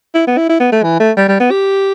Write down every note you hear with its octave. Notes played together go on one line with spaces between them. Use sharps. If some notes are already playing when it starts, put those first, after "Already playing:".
E4
B3
E4
E4
B3
A3
E3
A3
G3
G3
B3
G4